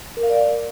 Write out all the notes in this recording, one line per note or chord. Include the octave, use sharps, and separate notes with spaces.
A#4
F5
D5